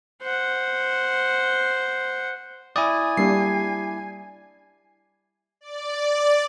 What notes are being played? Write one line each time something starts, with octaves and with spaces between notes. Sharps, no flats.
C5 F#5
E4 D5 G#5 D#6
G3 A#3 D4 C7
D5